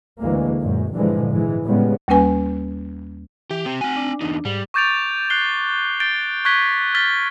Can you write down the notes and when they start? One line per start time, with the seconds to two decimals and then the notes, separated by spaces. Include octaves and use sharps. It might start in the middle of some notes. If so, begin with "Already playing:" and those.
0.20 D2 E3 G#3 A#3
0.59 F#2 A#2 G#3
0.93 G2 A#2 D3 E3 F3 G#3
1.30 G#2 E3 G#3
1.65 A2 C#3 G3 G#3 B3
2.08 D#2 G3 A#3 C#4 B4 G#5
3.51 E3 G4
3.66 C4 G4 G5
3.81 C4 F#4 G#5
3.97 D4
4.21 E2 D#4
4.45 G#2 G3
4.74 C#6 D6 G6 A6 D7 F7
5.30 F#6 C7 G7
6.00 G6 A6 D7 G7
6.45 C#6 F#6 G#6 B6 G7
6.95 F6 F#6 A6 B6 G7